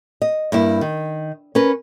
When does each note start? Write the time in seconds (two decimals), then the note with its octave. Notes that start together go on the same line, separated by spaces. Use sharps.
0.22 D#5
0.52 G2 A#3 E4
0.81 D#3
1.55 C#4 A#4 B4